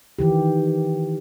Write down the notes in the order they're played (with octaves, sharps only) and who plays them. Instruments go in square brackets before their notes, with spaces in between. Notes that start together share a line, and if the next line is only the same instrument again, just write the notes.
[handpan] D#3 E3 G4